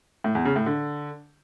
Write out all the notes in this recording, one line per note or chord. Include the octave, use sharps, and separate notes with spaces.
A2
E2
C#3
A2
D3